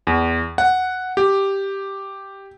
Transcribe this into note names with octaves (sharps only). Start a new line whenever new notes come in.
E2
F#5
G4